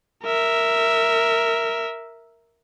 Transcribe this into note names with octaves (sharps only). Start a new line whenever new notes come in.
A#4 E5